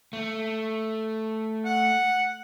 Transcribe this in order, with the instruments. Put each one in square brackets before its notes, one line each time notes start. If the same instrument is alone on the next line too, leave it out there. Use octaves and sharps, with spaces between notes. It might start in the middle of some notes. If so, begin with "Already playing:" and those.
[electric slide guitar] A3
[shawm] F#5